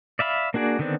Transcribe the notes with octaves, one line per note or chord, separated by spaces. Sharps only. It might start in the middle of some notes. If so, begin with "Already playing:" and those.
D5 E5 F5 B5
A#3 D4 F#4 G#4 D5
D3 D#3 B3 C4 D4